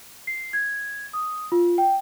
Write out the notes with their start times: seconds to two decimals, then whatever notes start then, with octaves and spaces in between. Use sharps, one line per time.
0.27 C7
0.53 G#6
1.13 D#6
1.52 F4
1.78 G5